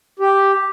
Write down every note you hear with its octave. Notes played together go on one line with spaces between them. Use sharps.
G4